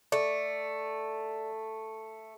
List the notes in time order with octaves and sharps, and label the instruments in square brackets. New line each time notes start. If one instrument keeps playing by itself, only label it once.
[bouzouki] A3 [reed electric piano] D5